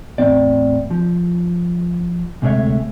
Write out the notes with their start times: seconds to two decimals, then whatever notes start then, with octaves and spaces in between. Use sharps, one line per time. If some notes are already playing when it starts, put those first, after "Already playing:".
0.18 E2 A2 C4 D5
0.91 F3
2.42 D2 C3 G#3 A3 C#5 E5